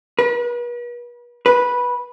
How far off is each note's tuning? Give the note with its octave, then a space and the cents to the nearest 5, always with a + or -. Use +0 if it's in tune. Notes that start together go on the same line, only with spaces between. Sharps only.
B4 -40
B4 -10